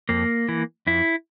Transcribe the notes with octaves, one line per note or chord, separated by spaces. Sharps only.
F2 A#3
E3
F2 E4